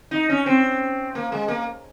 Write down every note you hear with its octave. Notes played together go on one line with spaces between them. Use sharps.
D#4
C#4
C4
A#3
G#3
A#3